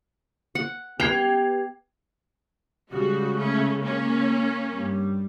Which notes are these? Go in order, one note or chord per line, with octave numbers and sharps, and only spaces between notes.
F#5
B3 G4 G5 G#6 C7 F7
C#3 G3 G#3 F#4
A3 C#4
A#3 C#4
G2 G3